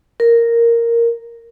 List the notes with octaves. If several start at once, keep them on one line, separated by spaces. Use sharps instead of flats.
A#4